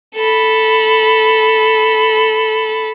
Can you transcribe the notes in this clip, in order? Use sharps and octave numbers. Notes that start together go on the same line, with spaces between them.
A4 B5